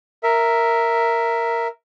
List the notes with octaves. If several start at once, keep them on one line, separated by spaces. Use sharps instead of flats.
A#4 E5